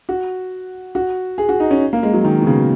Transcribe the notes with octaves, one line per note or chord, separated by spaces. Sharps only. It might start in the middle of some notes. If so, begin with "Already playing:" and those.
F#4
F#4
G#4
F#4
D#4
C#4
A#3
G#3
F#3
D#3
B2
C#3